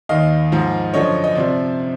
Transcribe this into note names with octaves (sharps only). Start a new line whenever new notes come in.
D#2 D#3 D#5 F5
G#2 F3
F#2 D3 F3 C#5 D#5
D#5
C3 F3 C5 D5